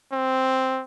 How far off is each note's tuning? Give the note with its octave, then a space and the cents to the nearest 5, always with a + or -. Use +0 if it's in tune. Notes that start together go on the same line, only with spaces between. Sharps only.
C4 +0